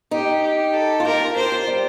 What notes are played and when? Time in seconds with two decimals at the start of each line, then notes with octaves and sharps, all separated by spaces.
0.11 D#4 G4
0.42 G4
0.74 A4
1.00 F4
1.05 G4 A#4
1.21 F4
1.36 G4 C5
1.52 F4
1.67 G3